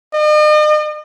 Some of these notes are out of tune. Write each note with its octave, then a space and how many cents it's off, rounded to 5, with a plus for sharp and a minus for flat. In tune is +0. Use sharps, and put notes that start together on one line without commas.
D#5 -45